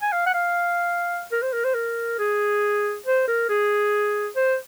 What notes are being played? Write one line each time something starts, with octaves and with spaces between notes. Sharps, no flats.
G#5
F5
F#5
F5
A#4
C5
A#4
C5
A#4
G#4
C5
A#4
G#4
C5